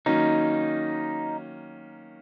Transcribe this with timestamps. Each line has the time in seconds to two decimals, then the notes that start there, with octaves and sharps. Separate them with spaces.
0.06 D#3 F#3 A#3 C#4 D#4